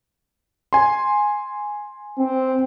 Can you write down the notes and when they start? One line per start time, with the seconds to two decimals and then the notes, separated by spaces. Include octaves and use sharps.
0.73 G#5 C6
2.18 C4